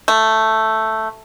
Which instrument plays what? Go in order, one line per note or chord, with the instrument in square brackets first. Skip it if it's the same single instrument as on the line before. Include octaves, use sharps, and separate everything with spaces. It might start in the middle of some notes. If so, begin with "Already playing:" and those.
[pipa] A3